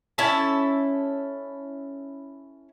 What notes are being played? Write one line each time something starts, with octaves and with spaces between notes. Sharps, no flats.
C#4 E4 A4 A5